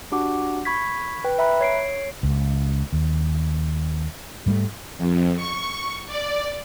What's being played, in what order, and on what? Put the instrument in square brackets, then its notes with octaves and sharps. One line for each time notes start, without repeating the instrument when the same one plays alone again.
[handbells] D4 F#4 G4 F#5 D6
B5 C#6 G#6 B6
B4 G5
E5 A#5 B5 F#6
C#5 C7 D7
[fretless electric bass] C#2
D#2
G#2 G3 A3
[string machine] F2
C#6
D5